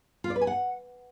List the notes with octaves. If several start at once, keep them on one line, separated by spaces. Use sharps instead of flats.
F4
D5
B4
G#5
F#5